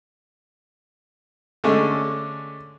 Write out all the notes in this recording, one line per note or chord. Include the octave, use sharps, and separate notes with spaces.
D3 G#3 A3 C#4